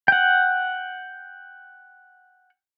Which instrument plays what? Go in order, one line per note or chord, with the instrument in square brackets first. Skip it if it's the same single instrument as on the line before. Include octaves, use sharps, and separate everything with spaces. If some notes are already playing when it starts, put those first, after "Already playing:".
[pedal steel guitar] F#5 G5